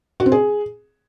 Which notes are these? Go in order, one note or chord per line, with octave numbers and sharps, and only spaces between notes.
F#4
C4
G#4